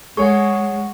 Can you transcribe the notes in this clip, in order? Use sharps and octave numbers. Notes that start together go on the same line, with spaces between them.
G#3 G#4 C#5 F#5 C#6